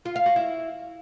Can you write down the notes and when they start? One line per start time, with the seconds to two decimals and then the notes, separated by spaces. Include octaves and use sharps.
0.05 F4
0.16 F5
0.26 F#4
0.36 E4